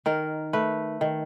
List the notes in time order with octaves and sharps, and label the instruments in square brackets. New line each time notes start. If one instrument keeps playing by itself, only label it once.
[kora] D#3 A#4
A3 B4
D#3